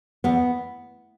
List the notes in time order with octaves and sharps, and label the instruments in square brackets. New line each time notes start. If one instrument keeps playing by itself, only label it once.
[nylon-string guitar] E2 B3